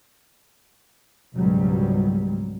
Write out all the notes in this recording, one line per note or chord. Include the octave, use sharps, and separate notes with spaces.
G#1 C#2 G#2 B2 F#3 G3